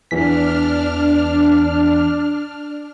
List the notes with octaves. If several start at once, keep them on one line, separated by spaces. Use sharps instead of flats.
E2 E3 D4 F6 B6